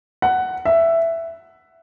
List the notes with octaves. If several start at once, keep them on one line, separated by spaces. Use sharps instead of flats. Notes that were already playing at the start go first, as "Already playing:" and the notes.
F#5
E5